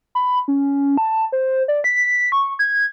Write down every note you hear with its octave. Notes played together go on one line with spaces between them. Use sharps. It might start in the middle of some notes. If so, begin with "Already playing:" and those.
B5
C#4
A5
C5
D5
B6
C#6
G#6